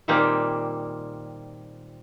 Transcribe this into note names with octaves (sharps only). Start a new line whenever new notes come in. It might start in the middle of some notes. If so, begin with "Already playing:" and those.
A#2 D#3 G3 A#3 C4 G4